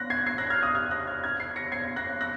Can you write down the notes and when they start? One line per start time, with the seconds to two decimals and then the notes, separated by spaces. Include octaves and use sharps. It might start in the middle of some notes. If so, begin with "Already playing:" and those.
Already playing: F#6 A#6
0.10 G#6 C7
0.26 G#6 C7
0.38 F#6 A#6
0.50 F6 G#6
0.62 D#6 F#6
0.75 F6 G#6
0.91 F#6 A#6
1.07 F6 G#6
1.24 F6 G#6
1.40 G#6 C7
1.56 A#6 C#7
1.72 G#6 C7
1.96 F#6 A#6
2.21 F#6 A#6